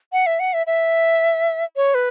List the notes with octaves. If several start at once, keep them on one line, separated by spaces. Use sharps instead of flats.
F#5
E5
F#5
E5
E5
C#5
B4